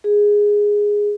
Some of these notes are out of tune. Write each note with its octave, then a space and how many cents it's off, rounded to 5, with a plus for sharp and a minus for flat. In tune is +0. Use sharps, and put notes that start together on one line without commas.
G#4 -5